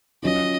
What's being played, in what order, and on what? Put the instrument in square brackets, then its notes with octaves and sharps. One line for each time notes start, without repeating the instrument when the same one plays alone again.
[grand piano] F#3 C#4 F4 [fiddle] D#5